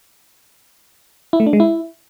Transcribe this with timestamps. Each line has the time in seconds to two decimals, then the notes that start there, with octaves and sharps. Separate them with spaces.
1.33 E4
1.40 A3
1.46 D4
1.53 G#3
1.60 E4